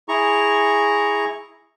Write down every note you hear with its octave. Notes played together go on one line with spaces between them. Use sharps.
E4 G#4 A#5 C#6